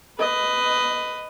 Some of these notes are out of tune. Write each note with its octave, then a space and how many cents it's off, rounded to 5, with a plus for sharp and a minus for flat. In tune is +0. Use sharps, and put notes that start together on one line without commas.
B4 +15 D#5 +0